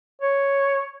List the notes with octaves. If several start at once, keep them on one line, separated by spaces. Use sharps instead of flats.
C#5